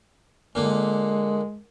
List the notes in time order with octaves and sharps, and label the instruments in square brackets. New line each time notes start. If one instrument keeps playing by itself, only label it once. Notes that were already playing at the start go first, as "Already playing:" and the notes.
[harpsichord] A#2 D3 A#3 [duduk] G#3